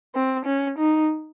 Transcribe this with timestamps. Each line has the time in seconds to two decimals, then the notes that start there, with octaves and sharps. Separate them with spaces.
0.15 C4
0.45 C#4
0.78 D#4